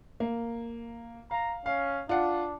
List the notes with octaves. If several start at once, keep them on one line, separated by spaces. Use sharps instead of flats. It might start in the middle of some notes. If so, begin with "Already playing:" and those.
A#3
F5 A#5
C#4 F5
D4 F4 F#5